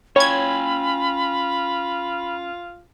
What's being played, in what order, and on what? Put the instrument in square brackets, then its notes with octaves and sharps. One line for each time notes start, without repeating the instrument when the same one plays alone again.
[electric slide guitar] C#4 G5 G#5 [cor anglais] F4 [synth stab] C#5 G#6 [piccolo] B5